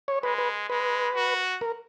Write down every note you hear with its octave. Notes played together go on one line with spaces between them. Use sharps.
C#5
G#3 B4
B4
G#3 B4
F#4
A#4